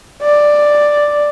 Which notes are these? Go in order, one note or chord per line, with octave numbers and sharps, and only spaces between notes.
D5